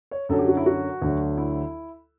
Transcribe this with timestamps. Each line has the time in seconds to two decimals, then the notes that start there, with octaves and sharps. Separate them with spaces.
0.11 C#5
0.29 F#2 D3 F#3 A4
0.39 G4
0.48 F#4
0.57 E4
0.66 F#4
1.02 D2 D3 F#3
1.37 E4